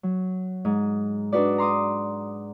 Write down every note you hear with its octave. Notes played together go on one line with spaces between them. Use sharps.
F#3
G#2
D4 D#4 F#4 B4 D5
A#5 C6 D6 D#6